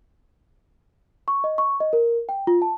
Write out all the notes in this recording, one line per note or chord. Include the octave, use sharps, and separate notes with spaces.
C#6
D#5
C#6
D#5
A#4
G5
F4
A5